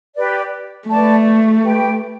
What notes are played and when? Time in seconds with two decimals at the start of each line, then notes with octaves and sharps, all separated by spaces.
0.15 G4 B4 D5
0.88 A3 B4 D5 A5
1.63 G4 B4 G5